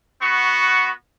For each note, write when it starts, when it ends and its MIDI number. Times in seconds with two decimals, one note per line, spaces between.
0.21 0.90 59
0.21 0.90 66
0.21 0.90 85